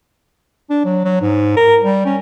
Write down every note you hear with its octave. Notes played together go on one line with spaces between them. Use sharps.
D4
F#3
F#3
G#2
A#4
G3
C#4